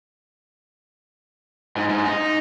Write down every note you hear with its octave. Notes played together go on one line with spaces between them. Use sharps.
G#2
G#2
D#4